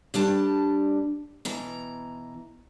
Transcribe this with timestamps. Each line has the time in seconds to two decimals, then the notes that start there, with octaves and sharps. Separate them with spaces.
0.14 D2 G3 D4 A5
1.45 B2 E3 A#5